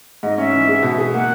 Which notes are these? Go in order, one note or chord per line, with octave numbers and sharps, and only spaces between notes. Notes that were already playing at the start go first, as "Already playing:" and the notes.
G#2 D#5
C#4 E5
E3
G#3
B2
G#4
A#3 F#5